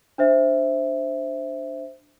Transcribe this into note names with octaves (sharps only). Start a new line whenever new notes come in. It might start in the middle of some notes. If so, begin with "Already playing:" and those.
D4 C5 E5